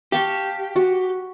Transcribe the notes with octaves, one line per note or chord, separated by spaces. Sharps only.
G4 F5 A5 C#6
F#4